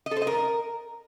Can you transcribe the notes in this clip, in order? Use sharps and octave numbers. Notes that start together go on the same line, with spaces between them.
D#5
A4
C5
D#5
A#4